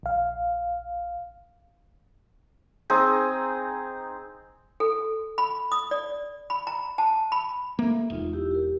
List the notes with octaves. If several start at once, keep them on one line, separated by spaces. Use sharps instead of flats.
A#1 F5
C4 D#4 G#4
A4
B5
D#6
D5
B5
A#5
A5
B5
A#3 A4 E5
E1 D#4 F4
E4 F4 G4
G4 A#4